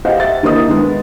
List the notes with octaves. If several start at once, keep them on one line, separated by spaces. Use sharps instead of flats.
G4 C5 D#5 F5 F#5
E5 A6
D#3 A#3 E4 C5 D#5 D#6
D#3 G#3 B3